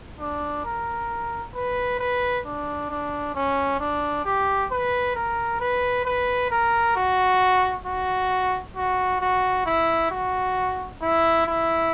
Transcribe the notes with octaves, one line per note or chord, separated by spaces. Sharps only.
D4
A#4
B4
B4
D4
D4
C#4
D4
G4
B4
A#4
B4
B4
A#4
F#4
F#4
F#4
F#4
E4
F#4
E4
E4